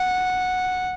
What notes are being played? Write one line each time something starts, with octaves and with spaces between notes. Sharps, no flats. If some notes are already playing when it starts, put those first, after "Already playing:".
Already playing: F#5